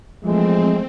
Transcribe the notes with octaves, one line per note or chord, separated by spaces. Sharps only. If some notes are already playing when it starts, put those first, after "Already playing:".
E3 F3 G#3 A3 C4